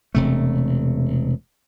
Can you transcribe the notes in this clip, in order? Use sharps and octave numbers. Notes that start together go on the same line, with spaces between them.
E1 C3 A3